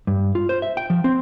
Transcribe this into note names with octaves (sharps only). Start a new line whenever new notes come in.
G2
F4
C5
E5
G5
F3
C4